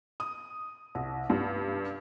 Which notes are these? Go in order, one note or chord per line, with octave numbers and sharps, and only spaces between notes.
D#6
C2
G2